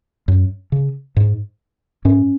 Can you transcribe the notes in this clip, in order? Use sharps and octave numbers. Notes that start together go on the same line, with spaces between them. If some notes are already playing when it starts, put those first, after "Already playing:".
F#2
C#3
G#2
G#2 C#4